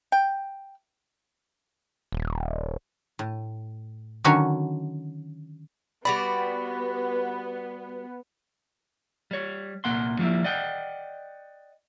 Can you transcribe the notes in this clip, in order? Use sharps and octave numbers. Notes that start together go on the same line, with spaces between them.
G5
D#1
A2
D3 D#3 F#3 C#4 F#4 C#5
G3 B3 F#4 D5 B5
G3 C#5
C2 A#2 A#3 F#5 C6
F3 G3 A3 A#3 E4
D5 D#5 F#5 G5